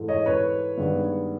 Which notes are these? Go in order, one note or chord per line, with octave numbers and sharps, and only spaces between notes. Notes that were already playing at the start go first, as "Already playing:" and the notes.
Already playing: G#2 E3 A3
C#5 D#5
B4 C#5
G2 D#3 G#3 B3